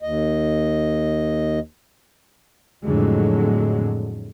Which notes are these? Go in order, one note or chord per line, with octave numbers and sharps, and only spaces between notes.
D#2 D#5
F2 A2 D3 F#3 G#3